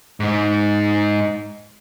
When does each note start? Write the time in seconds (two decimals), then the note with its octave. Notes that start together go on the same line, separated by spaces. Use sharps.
0.20 G#2 D#4